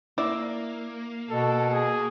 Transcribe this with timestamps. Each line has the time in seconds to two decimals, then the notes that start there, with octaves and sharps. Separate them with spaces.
0.18 A#3 E4 D5
1.30 B2 A4
1.71 G#4